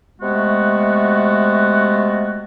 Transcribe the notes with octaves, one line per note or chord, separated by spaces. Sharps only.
C3 G#3 A3 B3 F#4